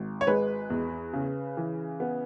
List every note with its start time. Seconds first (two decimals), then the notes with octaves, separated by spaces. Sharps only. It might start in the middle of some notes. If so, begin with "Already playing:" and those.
Already playing: G#1
0.21 C#5
0.27 G#3 B4
0.70 E2
1.13 C#3
1.57 E3
2.00 B3